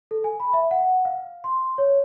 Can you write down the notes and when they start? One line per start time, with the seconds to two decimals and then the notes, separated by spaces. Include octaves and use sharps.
0.11 A4
0.24 G#5
0.40 B5
0.53 E5
0.71 F#5
1.05 F5
1.44 C6
1.78 C#5